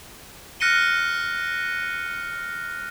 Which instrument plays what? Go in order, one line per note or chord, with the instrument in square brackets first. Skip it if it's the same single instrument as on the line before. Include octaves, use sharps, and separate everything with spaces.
[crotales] F6 F#6 A#6 C#7 D#7 G7